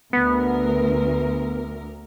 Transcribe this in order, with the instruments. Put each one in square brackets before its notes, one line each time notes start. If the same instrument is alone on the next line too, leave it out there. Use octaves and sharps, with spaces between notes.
[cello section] D2 A#4 [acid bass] B3